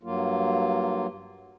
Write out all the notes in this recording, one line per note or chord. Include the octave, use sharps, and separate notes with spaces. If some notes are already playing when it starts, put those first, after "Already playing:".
G2 F#3 A#3 F4